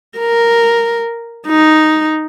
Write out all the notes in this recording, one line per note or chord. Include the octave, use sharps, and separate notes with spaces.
A#4
D#4